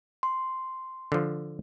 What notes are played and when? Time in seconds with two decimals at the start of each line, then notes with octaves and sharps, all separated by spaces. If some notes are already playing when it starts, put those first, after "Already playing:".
0.23 C6
1.12 D3 F3